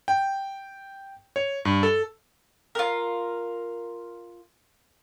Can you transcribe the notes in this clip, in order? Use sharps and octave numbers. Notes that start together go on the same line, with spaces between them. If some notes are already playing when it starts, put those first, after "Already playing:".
G5
C#5
G2
A4
F4 A#4